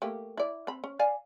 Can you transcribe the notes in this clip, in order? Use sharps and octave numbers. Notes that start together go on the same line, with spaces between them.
A3 A#3 G4
E4 D5
C4 B5
C#4
D5 F5 G#5